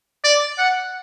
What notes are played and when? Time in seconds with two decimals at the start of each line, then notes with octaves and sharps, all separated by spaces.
0.24 D5
0.58 F#5